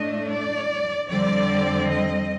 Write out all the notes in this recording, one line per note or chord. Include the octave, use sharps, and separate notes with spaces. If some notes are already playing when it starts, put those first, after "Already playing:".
Already playing: A2 A3 D4 D#5
D5
F2 D3 G3 C4 D5
D#5